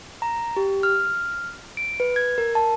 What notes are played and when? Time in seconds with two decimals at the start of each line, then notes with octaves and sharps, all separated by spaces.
0.22 A#5
0.57 G4
0.83 F6
1.77 D7
2.00 B4
2.16 G#6
2.38 A#4
2.55 A5